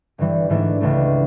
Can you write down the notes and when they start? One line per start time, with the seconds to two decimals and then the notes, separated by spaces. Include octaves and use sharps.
0.18 G1 G2 E3 G3
0.49 G#2 E3 A3 D4
0.80 C#2 C#3 E3 A3 D4